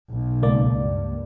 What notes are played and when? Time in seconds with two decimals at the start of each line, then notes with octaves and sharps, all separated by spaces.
0.10 B1
0.43 C#2 A#3 D5
0.79 G2